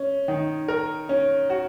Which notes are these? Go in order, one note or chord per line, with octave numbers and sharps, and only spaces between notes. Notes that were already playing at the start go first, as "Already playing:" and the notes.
Already playing: C#4
D#3
A#4
C#4
F#4